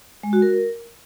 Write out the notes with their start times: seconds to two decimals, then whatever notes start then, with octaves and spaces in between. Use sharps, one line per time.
0.23 G#3
0.33 F#4
0.42 A#4